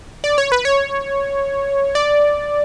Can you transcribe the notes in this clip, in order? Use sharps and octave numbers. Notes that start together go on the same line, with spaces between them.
D5
C#5
B4
C#5
D5